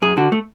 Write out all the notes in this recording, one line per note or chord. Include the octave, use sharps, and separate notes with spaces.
F#2 G#4
D3 F#4
A3